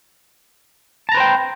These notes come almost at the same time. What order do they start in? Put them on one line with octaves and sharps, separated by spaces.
A5 A#5 B4 C5 G5